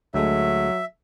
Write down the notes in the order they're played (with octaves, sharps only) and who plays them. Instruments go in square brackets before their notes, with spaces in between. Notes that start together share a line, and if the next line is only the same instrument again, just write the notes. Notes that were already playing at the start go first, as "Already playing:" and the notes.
[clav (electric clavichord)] D2 G#3 A3 [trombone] F#3 [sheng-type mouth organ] E5